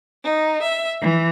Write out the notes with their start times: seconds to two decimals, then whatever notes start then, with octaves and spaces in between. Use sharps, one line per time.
0.24 D#4
0.63 E5
1.01 E3